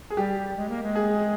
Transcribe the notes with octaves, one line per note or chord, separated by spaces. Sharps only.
G#4
G3 G4
G#3
A#3
G#3
G#4